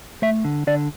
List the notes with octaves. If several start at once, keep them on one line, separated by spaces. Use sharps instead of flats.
A3 E5
D3
D3 D5